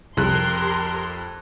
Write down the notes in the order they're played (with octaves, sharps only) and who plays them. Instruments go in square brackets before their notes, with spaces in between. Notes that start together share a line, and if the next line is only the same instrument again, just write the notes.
[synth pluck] C2 C#3 [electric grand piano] F2 F#6 [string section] G4 A#4 C6